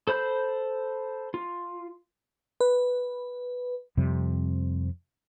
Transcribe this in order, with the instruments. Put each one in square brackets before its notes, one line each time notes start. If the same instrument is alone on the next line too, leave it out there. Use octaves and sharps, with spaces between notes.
[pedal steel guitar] A4 C5 B5 G6
F4
[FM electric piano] B4
[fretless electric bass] F2 C3 G3